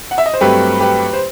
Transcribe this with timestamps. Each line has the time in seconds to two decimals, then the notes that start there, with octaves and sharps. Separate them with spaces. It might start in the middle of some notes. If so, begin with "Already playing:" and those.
0.11 F#5
0.18 E5
0.26 D#5
0.34 C5
0.40 G2 F#3 A3 C4 G4 B4
0.80 G4 B4
1.13 C5